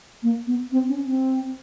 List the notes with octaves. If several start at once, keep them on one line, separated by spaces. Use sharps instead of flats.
A#3
B3
C4
C#4
C4